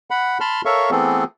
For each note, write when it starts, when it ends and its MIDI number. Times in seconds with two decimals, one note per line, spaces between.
0.11 0.38 78
0.11 0.38 83
0.40 0.61 81
0.40 0.61 83
0.40 0.61 84
0.40 0.61 89
0.65 0.90 69
0.65 0.90 70
0.65 0.90 73
0.65 0.90 76
0.65 0.90 77
0.65 0.90 85
0.91 1.24 52
0.91 1.24 57
0.91 1.24 59
0.91 1.24 60
0.91 1.24 68
0.91 1.24 69